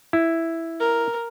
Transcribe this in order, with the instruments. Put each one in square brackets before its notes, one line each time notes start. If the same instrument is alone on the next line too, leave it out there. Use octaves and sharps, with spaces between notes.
[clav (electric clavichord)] E4
[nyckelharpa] A#4